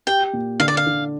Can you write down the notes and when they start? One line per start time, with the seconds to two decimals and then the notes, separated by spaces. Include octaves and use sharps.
0.07 G4 G5
0.33 A#2
0.60 D3 F5
0.68 D5
0.77 F5
0.87 D3